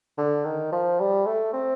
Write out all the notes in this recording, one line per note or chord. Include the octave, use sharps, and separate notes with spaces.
D3
D#3
F3
G3
A3
C4